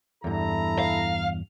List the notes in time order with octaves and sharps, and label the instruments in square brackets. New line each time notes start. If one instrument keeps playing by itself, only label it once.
[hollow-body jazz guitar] E2 G2 [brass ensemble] E4 A4 A#5
[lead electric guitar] F5